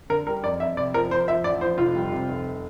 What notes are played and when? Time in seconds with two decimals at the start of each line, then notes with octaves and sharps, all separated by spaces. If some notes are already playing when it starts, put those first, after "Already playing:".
0.10 D3 A#4
0.27 G3 A#4
0.43 F2 D5
0.60 F2 E5
0.77 C3 D5
0.94 F3 A#4
1.10 F3 C5
1.28 F3 E5
1.44 A1 D5
1.61 F3 C5
1.78 F1 F4
1.95 G3
2.12 C3
2.29 F1